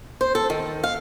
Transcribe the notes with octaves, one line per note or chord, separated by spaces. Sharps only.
C5
A4
D#3
F5